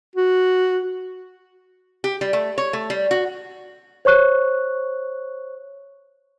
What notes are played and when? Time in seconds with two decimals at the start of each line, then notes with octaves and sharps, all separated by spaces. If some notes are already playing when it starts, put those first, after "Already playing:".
0.16 F#4
2.04 G4
2.21 G3
2.33 A3
2.58 C#5
2.73 A3
2.90 G3
3.11 F#4
4.05 C5 C#5 C#6 F#6